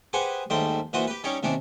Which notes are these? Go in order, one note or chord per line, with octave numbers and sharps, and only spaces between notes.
G4 G#4 B4 C5 F#5 G#5
D#2 G#2 G3 A3 C5 G5
A#2 E3 E4 F#4 C5 D#6
G4 B4
G3 C#4 D#4 G4 C#5 D6
D#2 C3 C#4 D4 D6